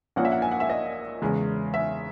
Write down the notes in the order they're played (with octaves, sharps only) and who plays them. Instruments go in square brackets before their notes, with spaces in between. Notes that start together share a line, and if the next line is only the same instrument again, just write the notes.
[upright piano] A#1 A#2 A#3 C#4 F#5
E5
F#5
G#5
F#5
E5
D#5
E2 C#3 G#3
E5